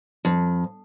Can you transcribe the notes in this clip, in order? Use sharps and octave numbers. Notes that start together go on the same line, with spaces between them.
F2